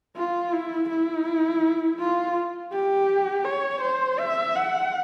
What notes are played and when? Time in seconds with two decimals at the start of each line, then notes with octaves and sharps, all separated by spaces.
0.16 F4
0.53 E4
0.89 E4
1.99 F4
2.72 G4
3.45 C#5
3.82 C5
4.19 E5
4.55 F#5